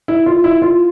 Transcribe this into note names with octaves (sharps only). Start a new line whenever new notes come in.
E4
F4
E4
F4